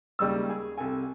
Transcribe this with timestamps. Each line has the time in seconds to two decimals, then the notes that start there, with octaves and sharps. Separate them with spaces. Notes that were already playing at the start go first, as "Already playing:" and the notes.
0.19 D#2 C#3 G3 G#3 E6
0.49 G#4
0.78 C2 A4 G#5